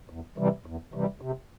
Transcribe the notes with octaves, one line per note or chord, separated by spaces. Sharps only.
E2
C3 E3 G3
E2
C3 E3 G3
C3